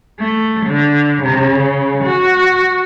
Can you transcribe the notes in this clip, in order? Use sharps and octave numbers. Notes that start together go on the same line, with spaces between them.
A3
D3
C#3
F#4